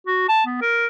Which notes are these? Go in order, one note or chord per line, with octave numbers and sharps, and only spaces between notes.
F#4
A5
B3
A#4